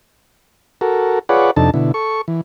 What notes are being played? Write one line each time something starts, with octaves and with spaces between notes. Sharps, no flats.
F#4 A4 A#4
F4 G#4 B4 C#5 D5 F#5
F2 C3 D4 D#4 A4 A5
B2 D3 E4
A4 C#6
E3